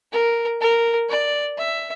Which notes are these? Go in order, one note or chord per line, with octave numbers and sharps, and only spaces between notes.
A#4
A#4
D5
E5